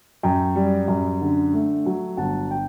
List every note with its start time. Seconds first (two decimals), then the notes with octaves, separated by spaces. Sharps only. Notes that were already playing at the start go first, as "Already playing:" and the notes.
0.23 F#2 G5
0.56 G3
0.88 F#2
1.21 D3
1.53 A3
1.86 F#3
2.17 G1 F#5 A5
2.51 G5